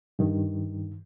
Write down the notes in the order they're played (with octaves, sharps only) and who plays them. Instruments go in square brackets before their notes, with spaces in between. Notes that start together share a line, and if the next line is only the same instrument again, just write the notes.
[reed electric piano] G2 D#3